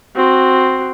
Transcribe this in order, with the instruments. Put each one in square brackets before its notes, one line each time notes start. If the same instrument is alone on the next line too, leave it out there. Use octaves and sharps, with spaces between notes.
[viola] C4 F#4